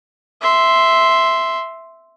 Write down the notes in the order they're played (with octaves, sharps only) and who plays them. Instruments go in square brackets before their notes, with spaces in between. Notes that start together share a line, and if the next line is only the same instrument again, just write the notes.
[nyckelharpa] E5 C6